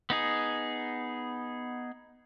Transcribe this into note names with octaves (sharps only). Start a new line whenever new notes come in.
B3 D#4 G#4